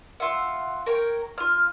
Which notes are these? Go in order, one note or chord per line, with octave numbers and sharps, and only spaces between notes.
F4 E5 F#5
A#4 C#5 G5
F4 F6